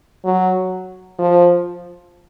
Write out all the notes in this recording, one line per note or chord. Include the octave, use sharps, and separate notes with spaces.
F#3
F3